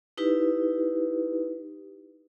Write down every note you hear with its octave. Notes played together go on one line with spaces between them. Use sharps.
D#4 E4 G4 B4